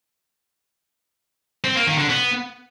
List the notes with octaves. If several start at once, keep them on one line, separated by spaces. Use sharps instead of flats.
C4
A#3
D#3
D3
B3